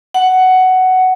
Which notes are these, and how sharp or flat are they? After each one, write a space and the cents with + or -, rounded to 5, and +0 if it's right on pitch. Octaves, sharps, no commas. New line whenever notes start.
F#5 +10